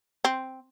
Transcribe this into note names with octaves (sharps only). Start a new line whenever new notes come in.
C4